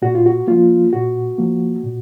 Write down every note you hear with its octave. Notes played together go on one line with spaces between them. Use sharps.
A#2 F#4
F4
F#4
F3 A#3 F4
A#2 F#4
F3 A#3
A#2